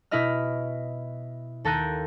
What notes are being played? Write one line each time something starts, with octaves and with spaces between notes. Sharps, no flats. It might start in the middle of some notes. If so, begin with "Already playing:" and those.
B2 E4 B4 D#5 F6
D#2 A4 A#4 F#6 G6 D#7